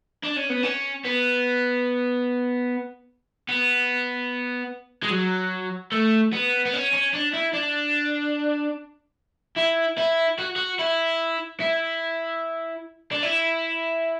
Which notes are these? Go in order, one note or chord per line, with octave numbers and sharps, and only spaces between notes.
D4
C#4
B3
C#4
B3
B3
G#3
F#3
A3
B3
B3
C#4
C#4
D4
E4
D4
E4
E4
F#4
F#4
E4
E4
D4
E4